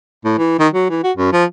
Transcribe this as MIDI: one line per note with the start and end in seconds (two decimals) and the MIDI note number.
0.25 0.34 45
0.38 0.58 52
0.59 0.68 51
0.73 0.87 54
0.90 1.02 52
1.04 1.12 66
1.17 1.30 42
1.33 1.44 53